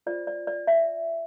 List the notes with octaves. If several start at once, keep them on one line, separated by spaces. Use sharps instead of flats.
F4 G#4 C5 D5
D5
D5
E5